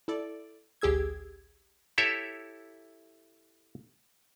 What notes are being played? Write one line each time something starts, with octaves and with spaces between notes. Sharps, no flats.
E4 A4 D5
A1 D2 G4 G#4 E6 G#6
E4 G4 A4 C#5 E5